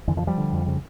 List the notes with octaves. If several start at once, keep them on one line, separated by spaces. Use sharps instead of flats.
F2 D3 E3
D#3 F3
D3
F3 G3
D3
F2
C#3